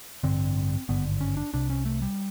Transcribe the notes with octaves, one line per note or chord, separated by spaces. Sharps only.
A1 G2 D3 C4
G#1 G2 D3 B3
C#4
D4
C2 C3 D4
C#4
A3
G3